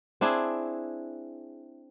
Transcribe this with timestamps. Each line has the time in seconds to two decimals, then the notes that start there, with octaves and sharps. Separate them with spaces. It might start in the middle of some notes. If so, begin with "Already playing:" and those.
0.21 C4 D4 E4 G#4